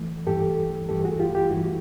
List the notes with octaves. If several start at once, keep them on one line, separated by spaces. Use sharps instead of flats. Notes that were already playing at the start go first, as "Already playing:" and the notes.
Already playing: E3 A3
G2 E3 A3 G4 A4
G2 E3 A3 G4 A4
F#4 G#4
F4 G4
F4 G4
G2 E3 A3 E4 F#4